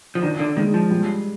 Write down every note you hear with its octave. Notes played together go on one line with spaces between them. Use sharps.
F3
D#3 D4
D3
D#3 G#3
F3
G3